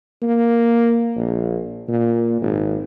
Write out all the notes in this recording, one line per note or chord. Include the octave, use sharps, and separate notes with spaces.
A#3
A#1
A#2
G#1